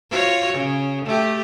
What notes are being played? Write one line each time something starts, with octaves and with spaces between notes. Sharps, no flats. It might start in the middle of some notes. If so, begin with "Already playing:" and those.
F4 F#4 C#5
C#3
A3 G4